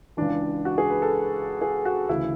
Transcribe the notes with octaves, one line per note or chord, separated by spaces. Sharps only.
C#2 C#3 E3 D4
F#4
G#4
B4
A4
G#4
F#4
D2 C#3 E3 E4